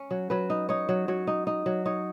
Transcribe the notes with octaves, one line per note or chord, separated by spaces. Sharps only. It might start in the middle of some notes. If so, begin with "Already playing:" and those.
Already playing: C#4
F#3
F#3 B4
D#4
D#4 C#5
F#3
F#3 C#5
D#4
D#4
F#3
D#4 C#5